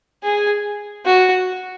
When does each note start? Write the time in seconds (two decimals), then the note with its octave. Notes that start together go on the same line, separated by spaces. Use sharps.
0.23 G#4
1.06 F#4